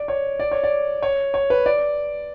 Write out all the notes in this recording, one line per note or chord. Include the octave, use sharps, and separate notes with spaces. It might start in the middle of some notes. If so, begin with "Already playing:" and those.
Already playing: D5
C#5
D5
C#5
D5
C#5
C#5
B4
D5